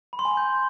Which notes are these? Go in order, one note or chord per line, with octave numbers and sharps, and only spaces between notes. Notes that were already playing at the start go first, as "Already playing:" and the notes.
B5
C6
G#5
C6
G6